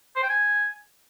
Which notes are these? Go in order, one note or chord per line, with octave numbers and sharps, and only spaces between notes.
C5
G5
G#5